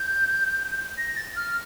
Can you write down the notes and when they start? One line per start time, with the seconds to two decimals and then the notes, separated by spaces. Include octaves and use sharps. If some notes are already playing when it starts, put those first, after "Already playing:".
Already playing: G6
0.97 A#6
1.17 A6
1.36 F6